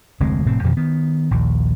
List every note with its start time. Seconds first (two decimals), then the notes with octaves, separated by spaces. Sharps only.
0.20 F1 D2 G#3 C4
0.46 F1 A2 C3 C4
0.64 F2 B2 D#3 E3
0.77 D#3 B3
1.31 A#1 D#2